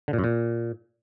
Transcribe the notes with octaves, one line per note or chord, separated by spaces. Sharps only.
D3
A#2
F#2
A#2